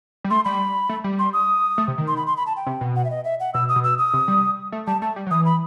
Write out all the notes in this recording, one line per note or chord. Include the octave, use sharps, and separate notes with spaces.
G3
A3 C6
G3 B5
A3
G3
C6
D#6
A3
C3
D#3
C6
B5
C6
B5
A5
G5
C3
B2
F#5
E5
D#5
E5
F#5
B2 E6
D#6
B2
E6
D#6
C3
G3
A3
G3 A5
A3 A5
G3
F#3
E3 D#6
B5